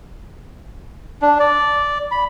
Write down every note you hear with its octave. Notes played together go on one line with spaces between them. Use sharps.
D4
D5
B5